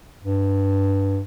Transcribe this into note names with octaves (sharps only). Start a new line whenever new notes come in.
G2